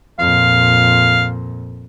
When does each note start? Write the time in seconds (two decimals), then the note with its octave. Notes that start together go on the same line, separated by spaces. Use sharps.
0.19 F2 A#2 F5